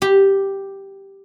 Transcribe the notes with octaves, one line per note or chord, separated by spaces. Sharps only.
G4